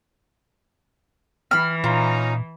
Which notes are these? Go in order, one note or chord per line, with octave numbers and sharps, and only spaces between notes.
E3 B5 F6
A#2 C#4 D#4 F4 A#5